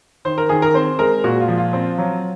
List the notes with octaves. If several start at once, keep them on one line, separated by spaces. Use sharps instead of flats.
D#3 C5
A#4
D#3 G#4
A#4
C4 C5
G#3 A#4
A#2 F#4
F4
F3
F4
C4
F#3